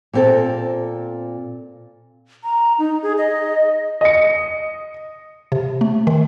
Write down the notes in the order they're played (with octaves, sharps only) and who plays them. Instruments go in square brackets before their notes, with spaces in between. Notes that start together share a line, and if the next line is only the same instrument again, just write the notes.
[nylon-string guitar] A#2 C4 A4
[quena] A#5
D#4
G#4
D#5
[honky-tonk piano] D#5 C#7
[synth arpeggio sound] C3
A3
D#3